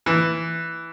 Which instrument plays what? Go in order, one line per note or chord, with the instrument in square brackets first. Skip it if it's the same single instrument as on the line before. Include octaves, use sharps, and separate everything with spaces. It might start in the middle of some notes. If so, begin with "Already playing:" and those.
[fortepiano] E3